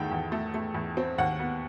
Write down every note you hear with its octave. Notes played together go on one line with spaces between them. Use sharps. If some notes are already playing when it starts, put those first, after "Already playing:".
Already playing: E2 D#3 A3 F#5 G5
E2
A3
A3
E2
C4
D#2 F#5
B3